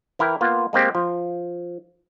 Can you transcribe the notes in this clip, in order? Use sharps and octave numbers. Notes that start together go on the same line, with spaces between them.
E3 E4 A#4 G5
A#3 B3 F4
G#3 A#3 C4 G4
F3